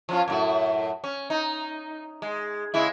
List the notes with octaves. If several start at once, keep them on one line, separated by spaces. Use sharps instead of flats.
F3 C#4 F4
F#2 A2 F#4
C#4
D#4
G#3
C#3 G#3 E4